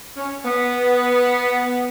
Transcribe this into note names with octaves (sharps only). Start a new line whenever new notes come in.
C#4
B3